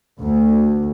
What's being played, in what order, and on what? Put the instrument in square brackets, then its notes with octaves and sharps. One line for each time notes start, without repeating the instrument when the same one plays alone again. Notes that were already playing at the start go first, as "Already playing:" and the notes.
[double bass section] D2